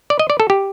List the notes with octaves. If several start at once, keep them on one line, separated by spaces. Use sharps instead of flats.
D5
D#5
D5
A4
G4